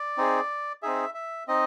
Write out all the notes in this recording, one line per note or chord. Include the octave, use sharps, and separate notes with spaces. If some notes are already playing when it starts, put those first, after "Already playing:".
Already playing: D5
C4 D#4 G#4
C4 D#4 G#4 E5
E5
C4 D#4 D#5